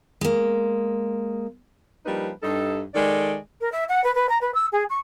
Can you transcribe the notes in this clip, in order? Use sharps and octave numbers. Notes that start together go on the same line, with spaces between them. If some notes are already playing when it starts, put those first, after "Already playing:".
G#3 A#3
F3 G3 A#3 D4 D#4 B4
G2 D#4 A4
D#3 G#3 A4 D5
A#4
E5
F#5
B4
B4
A#5
B4
E6
G#4
C#6